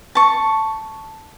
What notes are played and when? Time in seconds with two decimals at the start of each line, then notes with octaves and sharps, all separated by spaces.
0.15 A5 C#6